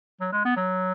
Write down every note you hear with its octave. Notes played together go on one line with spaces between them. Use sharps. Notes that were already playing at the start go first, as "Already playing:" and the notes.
F#3
G#3
B3
F#3